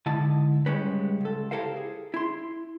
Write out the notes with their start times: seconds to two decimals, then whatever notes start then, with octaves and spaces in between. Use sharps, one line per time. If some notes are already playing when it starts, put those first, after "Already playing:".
0.06 G#2 D3 E4 D#5 A5
0.66 C#2 G#2 G3 G#3 C#4 B4
1.21 C#2 A4
1.51 E4 G4 A4 A#4 C5 F5
1.76 G#4
2.14 E4 C6